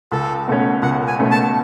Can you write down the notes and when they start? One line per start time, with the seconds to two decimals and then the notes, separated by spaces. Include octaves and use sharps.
0.12 C#2 A4
0.48 B2 A3 C#4
0.82 C#2 F#5
1.08 G#5
1.19 B2 A3 C#4
1.31 A5